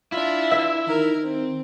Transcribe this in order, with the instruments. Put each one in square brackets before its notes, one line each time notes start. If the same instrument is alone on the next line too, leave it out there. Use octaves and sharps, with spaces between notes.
[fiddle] D4 F4 [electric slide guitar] E4
[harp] E5
[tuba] D#3 [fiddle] A#4
[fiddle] C4